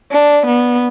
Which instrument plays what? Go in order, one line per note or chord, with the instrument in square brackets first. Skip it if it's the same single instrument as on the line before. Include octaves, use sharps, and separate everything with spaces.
[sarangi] D4
B3